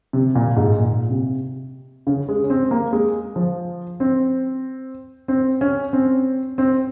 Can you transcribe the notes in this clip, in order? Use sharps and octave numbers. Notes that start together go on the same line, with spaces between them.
C3
A#2
G#2
A#2
C3
C#3
G#3
C#4
C4
A#3
G#3
F3
C4
C4
C#4
C4
C4